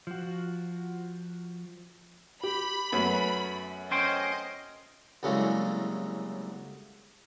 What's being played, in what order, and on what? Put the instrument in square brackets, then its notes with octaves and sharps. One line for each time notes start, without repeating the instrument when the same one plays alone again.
[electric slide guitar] F3 F#4
[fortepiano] G4 [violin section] B5
[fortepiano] F#2 A3 B3
[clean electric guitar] C#4 C5 G5 [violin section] D#5
[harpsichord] C2 A2 C#3 F#3 G#3 A#3